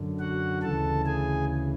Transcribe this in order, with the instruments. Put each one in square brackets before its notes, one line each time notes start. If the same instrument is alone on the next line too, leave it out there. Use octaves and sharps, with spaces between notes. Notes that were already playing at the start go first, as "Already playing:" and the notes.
Already playing: [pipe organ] F#2 D3
F#4 F#5
D2 C#3 E3 A4 A5
G#4 G#5